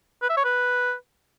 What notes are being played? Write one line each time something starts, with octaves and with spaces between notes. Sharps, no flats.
B4
E5
C#5
B4